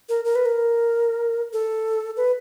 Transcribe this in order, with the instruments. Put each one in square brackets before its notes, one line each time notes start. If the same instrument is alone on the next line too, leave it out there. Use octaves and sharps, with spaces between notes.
[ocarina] A#4
A#4
B4
A#4
A4
B4